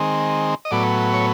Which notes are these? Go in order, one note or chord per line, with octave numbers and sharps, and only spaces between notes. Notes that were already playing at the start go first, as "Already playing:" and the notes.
Already playing: D#3 G#3 C4
D#5
A2 F#3 B3 D5
C#5